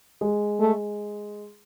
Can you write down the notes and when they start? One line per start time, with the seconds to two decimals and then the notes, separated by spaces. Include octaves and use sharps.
0.21 G#3
0.60 A3